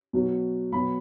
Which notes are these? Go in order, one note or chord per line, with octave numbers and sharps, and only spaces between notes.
B2 F#3
B2 F#3 B5